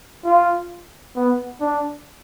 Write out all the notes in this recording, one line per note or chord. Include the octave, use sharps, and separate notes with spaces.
F4
B3
D4